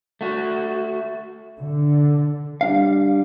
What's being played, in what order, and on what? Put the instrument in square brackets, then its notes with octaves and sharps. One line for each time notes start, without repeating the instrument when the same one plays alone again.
[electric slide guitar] A3 F#4
[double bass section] D3
[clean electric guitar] G3 D4 F5